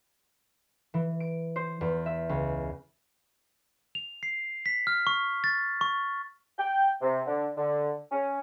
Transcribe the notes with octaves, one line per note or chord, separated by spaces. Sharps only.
E3
D7
C5
E2
E5
C#2
F7
C7
B6
F6
C#6
A6
C#6
G5
C3
D3
D3
C#4